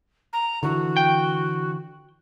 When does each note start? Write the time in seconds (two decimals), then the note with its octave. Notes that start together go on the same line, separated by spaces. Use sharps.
0.33 A#5
0.63 D3 E3 F#4
0.97 G5